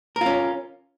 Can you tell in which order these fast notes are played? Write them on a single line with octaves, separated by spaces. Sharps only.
A#4 F4 C#4